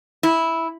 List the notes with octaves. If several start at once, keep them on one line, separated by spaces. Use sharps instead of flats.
E4